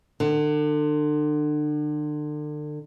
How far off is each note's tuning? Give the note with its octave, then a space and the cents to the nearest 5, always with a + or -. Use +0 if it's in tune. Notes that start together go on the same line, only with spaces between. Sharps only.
D3 +35